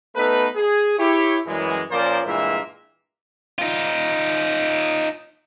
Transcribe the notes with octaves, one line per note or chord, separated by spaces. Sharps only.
A3 B3 D#4 A4 B4
G#4
E4 G4 C#5
F#2 E3 G3 G#3
A#2 F3 C#4 A#4 C5 D5
G2 A#2 E3 G#3 A#3 E5
D#4 F4